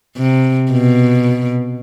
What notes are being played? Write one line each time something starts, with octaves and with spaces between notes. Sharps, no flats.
C3
B2